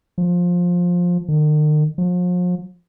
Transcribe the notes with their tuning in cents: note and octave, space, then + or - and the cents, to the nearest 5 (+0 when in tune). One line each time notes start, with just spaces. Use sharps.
F3 +15
D#3 -45
F3 +40